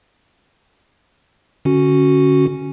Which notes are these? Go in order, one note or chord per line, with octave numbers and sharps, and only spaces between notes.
D3 C#4 F#4